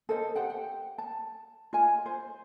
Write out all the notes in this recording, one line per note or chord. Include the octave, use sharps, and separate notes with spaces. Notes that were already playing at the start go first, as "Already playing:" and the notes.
A4 A#4 C5 D#5
G4 C5 F#5 G5
G5
A5
F4 D#5 G#5
C5